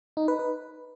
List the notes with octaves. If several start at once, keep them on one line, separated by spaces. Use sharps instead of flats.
D#4
B4
B4